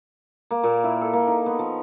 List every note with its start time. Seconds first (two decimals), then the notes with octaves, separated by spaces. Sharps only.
0.51 A#3
0.64 A#2
0.84 E4
1.01 A4
1.13 A#3
1.27 D#4
1.46 B3
1.59 F3